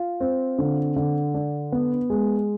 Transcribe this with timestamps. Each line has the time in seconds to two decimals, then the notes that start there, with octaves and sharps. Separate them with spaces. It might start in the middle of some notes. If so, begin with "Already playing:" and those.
Already playing: F4
0.20 C4
0.58 D3
0.96 D3
1.34 D4
1.72 B3
2.10 G#3